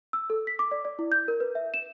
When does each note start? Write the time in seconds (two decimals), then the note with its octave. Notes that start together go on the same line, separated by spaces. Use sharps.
0.13 E6
0.30 A4
0.47 B6
0.59 D6
0.71 D5
0.85 D5
0.99 E4
1.12 G6
1.28 A#4
1.40 B4
1.55 E5
1.74 E7